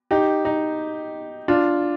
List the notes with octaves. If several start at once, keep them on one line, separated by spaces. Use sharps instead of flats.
D#4 G4
D#4
D4 F4